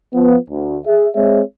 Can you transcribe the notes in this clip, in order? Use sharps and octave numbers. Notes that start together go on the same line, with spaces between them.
F3 B3
D2
G#4 E5
G#3 C4 G#4 C#5 E5